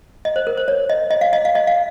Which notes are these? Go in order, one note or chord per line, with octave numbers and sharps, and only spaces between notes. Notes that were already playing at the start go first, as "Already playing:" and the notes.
D#5
C5
A#4
C5
C#5
D#5
D#5
F5
D#5
F5
D#5
F5